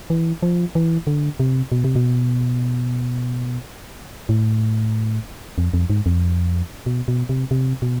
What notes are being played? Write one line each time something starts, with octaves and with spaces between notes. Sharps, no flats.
E3
F3
E3
D3
C3
B2
C3
B2
A2
F2
F2
G#2
F2
B2
B2
C3
C3
B2